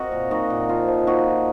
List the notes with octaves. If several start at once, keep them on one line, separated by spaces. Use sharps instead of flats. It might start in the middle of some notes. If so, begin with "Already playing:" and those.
Already playing: C4 F#4 A#4 D#5
A#2
A#2 D#4 F#4
A#2
F3 F4
F3
A#3 D#4 F#4
F3